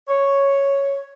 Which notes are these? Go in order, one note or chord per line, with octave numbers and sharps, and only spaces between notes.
C#5